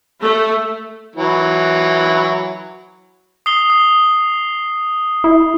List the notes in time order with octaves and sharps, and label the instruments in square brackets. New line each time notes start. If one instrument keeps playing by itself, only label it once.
[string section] A3
[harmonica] E3 F#3
[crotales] D#6 C7 G7
D#6
[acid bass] E4